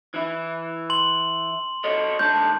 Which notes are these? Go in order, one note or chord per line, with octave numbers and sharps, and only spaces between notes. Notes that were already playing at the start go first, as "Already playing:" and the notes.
E3 E4
C6 F#7
A4 C#5 D#5
G#2 D3 A5 G6